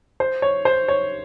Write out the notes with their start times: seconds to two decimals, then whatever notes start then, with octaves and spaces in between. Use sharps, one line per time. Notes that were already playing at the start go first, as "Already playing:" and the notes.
0.20 C5
0.42 C#5
0.65 C5
0.88 C#5